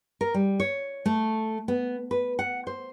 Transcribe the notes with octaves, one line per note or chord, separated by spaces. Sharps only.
A#4
G3
C#5
A3
B3
B4
F#5
C5